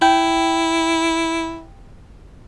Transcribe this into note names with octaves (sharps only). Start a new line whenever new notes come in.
E4 G5